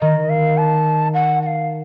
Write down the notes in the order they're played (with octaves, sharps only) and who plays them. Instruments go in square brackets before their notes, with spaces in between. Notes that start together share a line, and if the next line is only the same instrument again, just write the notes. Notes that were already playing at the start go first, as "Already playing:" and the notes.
[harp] D#3 [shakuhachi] D#5
[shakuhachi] F5
A5
F#5
F#5
F5